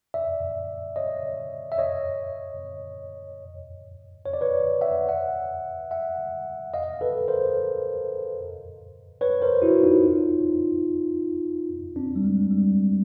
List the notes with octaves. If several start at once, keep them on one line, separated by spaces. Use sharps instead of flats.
D5 E5
C#5 D#5
E5
C#5 D#5
C#5
D5
B4 C#5
E5 F#5
E5 F#5
E5 F#5
D#5 F5
A4 B4
A#4 C5
B4 C#5
A#4 C5
E4 F#4
D#4 F4
C4 D4
G3
G#3
G3